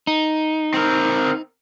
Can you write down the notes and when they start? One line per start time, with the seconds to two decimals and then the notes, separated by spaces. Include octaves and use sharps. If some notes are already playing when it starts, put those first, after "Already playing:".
0.07 D#4
0.74 C4 A#4